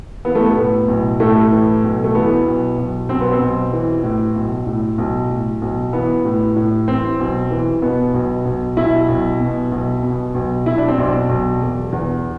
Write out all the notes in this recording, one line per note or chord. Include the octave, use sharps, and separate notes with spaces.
E3 B3
A3
B3
A2
B1
A2 A3
E3
B1
A3
E3 B3
B1
B1
B1 C4
B3
C4
B1
E3
A2
B1
A2
B1
A2
B1
E3 B3
A2
A2
E3 C4
B1
E3
B2 B3
B1
B1
B1 E4
B1
B2
B1
B2
B1
B1 E4
D4
C4
B1 D4
B1
E1
E2